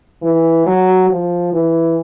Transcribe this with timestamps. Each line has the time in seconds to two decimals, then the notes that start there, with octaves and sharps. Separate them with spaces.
0.23 E3
0.66 F#3
1.10 F3
1.53 E3